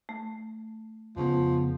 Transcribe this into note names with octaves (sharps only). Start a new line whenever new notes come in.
A3
F2 C#3 F3 B3